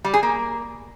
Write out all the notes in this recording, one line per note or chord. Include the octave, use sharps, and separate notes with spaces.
G3
G#4
A#3